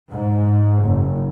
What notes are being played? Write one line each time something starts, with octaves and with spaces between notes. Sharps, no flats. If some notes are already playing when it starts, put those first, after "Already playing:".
G#2
F#1